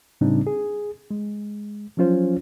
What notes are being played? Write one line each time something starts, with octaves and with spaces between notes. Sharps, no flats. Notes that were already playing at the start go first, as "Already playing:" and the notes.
A2 C#3 G3 C4 D4 D#4
G#4
G#3
F3 F#3 C#4 F4 C5